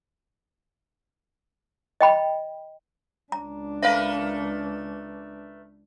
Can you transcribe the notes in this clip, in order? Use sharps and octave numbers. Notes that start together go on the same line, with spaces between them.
D#5 G5 B5
C#2 D4 A#5
A3 A#4 B4 E5 F5